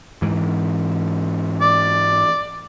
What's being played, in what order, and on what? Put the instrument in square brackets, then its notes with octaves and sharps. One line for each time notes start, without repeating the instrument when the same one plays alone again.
[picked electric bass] G#2 E3
[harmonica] D5